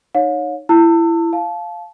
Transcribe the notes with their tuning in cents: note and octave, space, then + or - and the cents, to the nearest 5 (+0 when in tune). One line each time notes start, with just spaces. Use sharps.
D#4 -15 C#5 +0 F5 +40
E4 +20 A5 +40 E6 +0
F5 +0 A5 -20